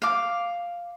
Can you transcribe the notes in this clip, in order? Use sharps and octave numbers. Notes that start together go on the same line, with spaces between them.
F5 D6